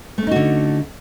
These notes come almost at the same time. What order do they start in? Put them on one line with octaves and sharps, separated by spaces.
A3 C#4 D#4 F#4 D3